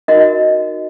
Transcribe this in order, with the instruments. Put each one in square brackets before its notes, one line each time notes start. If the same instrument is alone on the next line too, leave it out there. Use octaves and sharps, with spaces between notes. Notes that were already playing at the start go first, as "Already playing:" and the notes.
[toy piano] D#4 F#4 A#4 D#5